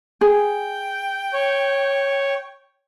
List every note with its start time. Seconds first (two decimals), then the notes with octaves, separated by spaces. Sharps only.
0.21 G#4 G5
1.33 C#5